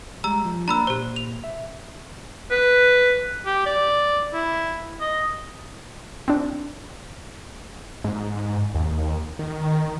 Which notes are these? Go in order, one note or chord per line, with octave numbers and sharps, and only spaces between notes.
G3 G#3 A#5 E6
F3
A#3 D4 A#5 B5 E6
A#2 G4 C5 C6
F7
E5
B4
G4
D5
E4
D#5
C4 D4
G#2
D#2
D#3